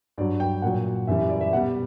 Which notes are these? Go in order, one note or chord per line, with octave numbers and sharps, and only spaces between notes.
G2 F#3 D5
G5
A#2 F#3 F#5
F#2 E3 G3 E5
D5
E5
B2 G3 F#5